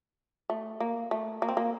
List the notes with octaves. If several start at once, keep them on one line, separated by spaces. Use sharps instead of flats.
A3
A#3
A3
A#3
C4
A#3